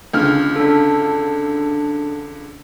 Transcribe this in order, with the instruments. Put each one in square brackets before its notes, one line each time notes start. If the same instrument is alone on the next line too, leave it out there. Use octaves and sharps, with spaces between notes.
[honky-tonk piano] C#2 D3 F6
[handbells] D4 A4